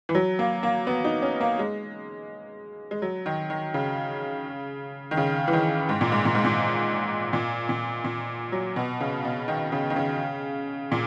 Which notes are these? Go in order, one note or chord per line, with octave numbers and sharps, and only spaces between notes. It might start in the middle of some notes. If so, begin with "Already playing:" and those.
E3
F#3
A#3
A#3
B3
D#4
C#4
A#3
G#3
G#3
F#3
D#3
D#3
C#3
D#3
C#3
E3
D#3
G#2
A#2
G#2
A#2
G#2
A#2
A#2
A#2
A#2
F#3
B2
C#3
B2
D#3
C#3
D#3
C#3
A#2